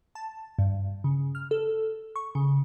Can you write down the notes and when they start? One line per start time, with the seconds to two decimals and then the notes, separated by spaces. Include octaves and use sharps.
0.15 A5
0.59 G2
1.04 C#3
1.35 F6
1.51 A4
2.16 C#6
2.35 C#3